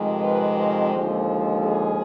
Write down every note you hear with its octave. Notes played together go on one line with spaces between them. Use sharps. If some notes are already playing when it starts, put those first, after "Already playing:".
Already playing: F2 C3 D#3 G#3
B4
C5
D#2 D3 F3 G#3
G#4